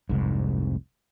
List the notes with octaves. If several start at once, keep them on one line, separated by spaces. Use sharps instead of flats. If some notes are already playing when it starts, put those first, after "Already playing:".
F1 C2 G#2